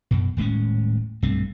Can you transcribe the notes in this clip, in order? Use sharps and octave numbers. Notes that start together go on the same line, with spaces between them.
F#2 B2
D#1 A2 G#3 C#4
B1 G2 A3 C4